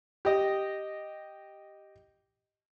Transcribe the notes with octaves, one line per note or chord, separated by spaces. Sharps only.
G4 D#5